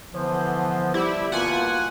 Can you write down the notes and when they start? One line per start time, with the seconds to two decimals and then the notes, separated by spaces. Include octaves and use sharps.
0.13 D3 E3 F3 B3 C5
0.94 G3 E4 G4
1.32 B2 A#3 F4 F#5 G#5